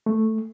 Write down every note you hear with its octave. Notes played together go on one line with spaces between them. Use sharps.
A3